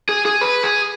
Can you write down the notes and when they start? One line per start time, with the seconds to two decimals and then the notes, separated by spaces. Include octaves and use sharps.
0.09 G#4
0.26 G#4
0.41 B4
0.63 G#4